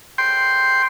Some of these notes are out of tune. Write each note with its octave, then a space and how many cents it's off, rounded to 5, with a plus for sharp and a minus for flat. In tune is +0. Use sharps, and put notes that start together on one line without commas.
G5 +0 C6 +0